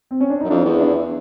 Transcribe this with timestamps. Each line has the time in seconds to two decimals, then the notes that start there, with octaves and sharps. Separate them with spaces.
0.11 C4
0.20 C#4
0.30 D4
0.40 F#2 D#4
0.50 F2 D4 E4
0.65 E2
0.80 D4 E4